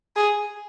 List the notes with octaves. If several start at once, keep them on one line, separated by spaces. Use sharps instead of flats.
G#4